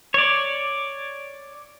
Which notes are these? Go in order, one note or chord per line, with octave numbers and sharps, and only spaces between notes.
C#5 D5